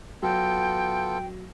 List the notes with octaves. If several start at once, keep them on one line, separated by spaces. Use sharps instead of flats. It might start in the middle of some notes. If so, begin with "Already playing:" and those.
F#3 B3 F4 A4 G5